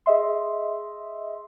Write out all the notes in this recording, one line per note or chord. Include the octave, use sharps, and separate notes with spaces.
G#4 D#5 E5 C6